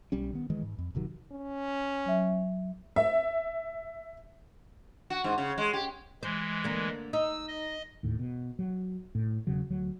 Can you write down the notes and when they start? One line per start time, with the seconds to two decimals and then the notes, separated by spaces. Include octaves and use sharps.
0.12 B1 G3 C#4
0.33 D#3 B3
0.50 D#3 E3 G#3
0.62 G#2
0.79 F2
0.95 D#1 C3 D#3 F#3
1.32 C#4
2.06 F#3 E5
2.96 E5
5.10 F#4
5.24 G#2
5.38 C#3
5.58 G#3
5.73 G4
6.23 E3 G#3 C5
6.64 D3 A#3
7.13 D#4 E6
7.48 D#5
8.03 D#2 A2
8.19 B2
8.59 F#3
9.15 A2
9.47 E1 C#3 F#3
9.70 D2 F#3